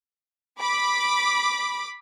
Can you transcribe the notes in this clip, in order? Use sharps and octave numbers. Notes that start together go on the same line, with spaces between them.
B5 D6